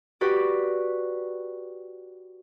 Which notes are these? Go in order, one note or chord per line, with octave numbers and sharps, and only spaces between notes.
F#4 G4 B4 D5